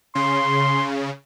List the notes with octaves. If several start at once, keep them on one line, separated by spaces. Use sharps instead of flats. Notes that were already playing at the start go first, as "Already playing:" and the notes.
C#3 C6